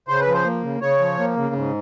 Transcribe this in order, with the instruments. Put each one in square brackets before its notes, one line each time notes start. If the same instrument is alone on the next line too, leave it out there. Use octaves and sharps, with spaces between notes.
[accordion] C#3 C5
B4
F3
C5
A#3
C#3
C#3 C#5
F3
A#3
C#3
G#2